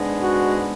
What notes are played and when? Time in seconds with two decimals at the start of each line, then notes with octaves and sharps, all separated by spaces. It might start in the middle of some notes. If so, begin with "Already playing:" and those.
Already playing: G#2 G#3 B3 D4
0.21 F#4